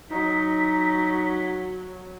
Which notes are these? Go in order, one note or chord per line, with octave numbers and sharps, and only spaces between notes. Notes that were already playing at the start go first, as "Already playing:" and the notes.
F#3 D#4 B6